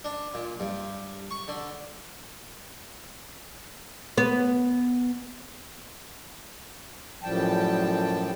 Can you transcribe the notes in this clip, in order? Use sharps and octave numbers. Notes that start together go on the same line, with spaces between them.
D4
A#2
G2
C#6
D3
B3
F#2 A2 F3 G3 G5 A5